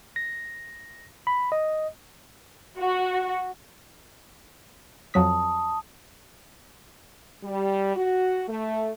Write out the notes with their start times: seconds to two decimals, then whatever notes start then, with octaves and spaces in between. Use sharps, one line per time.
0.16 A#6
1.27 B5
1.52 D#5
2.80 F#4
5.14 F2 F#3 A5 D#6 B6
7.44 G3
7.95 F#4
8.49 A3